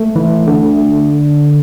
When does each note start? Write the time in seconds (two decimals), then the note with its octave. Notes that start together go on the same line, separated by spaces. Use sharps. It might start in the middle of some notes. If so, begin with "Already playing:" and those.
Already playing: A3
0.16 E3
0.47 D3